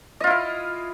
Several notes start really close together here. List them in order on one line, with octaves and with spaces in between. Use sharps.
D#5 F4 E4 F5